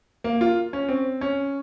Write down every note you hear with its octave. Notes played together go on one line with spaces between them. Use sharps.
A#3
F4
C#4
C4
C#4